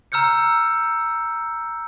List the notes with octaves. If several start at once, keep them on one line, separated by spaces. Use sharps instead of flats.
A#5 E6 F6 G6 C#7